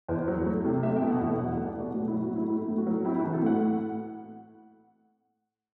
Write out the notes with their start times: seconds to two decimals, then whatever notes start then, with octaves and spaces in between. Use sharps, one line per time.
0.08 E2 C5
0.28 F#3
0.46 A3
0.65 C3
0.83 A3 E5
0.96 G5
1.02 B2
1.11 F#5
1.20 E2
1.27 E5
1.38 F#3 F#5
1.53 F#5
1.57 A3
1.67 D5
1.76 B2 F#4
1.94 A2 F#4
2.07 E4
2.13 F#3
2.22 F#4
2.31 A2 E4
2.49 A3 E4
2.68 A2
2.78 F#4
2.87 F#3
3.05 C4 E4
3.15 E4
3.19 F#4
3.24 E3
3.33 A4
3.42 A2 F#5